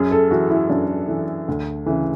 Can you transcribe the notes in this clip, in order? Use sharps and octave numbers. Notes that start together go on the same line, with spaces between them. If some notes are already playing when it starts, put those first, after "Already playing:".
Already playing: F#2 G#4
A4
E3 F#4
E4
F#2 D4
E3
D2
C#3 E3